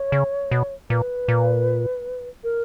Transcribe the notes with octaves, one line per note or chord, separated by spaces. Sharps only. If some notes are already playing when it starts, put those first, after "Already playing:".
Already playing: C#5
C#3
B2
A#2 B4
A#2
A#4